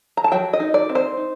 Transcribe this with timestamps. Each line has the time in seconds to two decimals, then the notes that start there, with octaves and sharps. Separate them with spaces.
0.17 A#5
0.24 A5
0.32 F#3 G5
0.53 D#5
0.60 D#4
0.74 D5
0.89 C4
0.95 C5
1.17 D#4